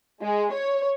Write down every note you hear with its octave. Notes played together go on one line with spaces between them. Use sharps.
G#3
C#5